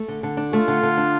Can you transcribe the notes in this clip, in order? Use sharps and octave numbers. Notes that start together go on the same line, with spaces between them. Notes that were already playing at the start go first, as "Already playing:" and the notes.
Already playing: A3
D3
D3
D4
A3 F4
D3
D3
D4